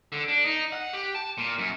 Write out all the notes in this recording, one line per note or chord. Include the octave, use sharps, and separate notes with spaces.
D3
D4
D#4
F#5
G4
A5
A#2
F#2